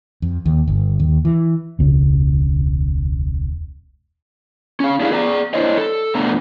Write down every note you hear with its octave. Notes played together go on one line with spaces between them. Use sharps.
F2
D#2
G1
D#2
E3
E1 C#2
C#4 F5
D4 E4 G4 G#4 E5 F5
G#4 D5 A#5
D4 E4 C5 C#5 D#5
A4
F2 B2 A3 B3 D4 A#5